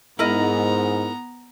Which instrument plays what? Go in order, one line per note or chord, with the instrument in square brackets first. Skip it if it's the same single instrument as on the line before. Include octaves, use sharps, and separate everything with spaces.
[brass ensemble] G#2 [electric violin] B3 A#5 [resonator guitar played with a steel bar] E4 A#4 D#5